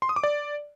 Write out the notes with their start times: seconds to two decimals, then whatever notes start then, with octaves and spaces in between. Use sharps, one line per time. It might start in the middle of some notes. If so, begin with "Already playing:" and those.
0.02 C6
0.09 D#6
0.16 D6
0.23 D5